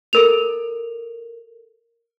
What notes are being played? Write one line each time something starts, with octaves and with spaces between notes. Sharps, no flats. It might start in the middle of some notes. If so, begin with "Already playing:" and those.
A4 A#4 F7